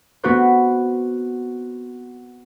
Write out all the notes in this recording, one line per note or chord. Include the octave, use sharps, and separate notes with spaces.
B3 C4 F#4 B4 C5